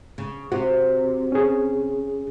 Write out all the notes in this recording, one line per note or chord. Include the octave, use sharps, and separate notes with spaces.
C#3
C3 F#4
C#4 G#4